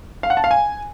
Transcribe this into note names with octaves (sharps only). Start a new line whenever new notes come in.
F5
F#5
A5
F5
G#5